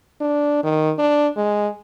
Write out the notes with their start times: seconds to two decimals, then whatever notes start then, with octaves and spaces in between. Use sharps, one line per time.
0.21 D4
0.63 D#3
0.98 D4
1.36 G#3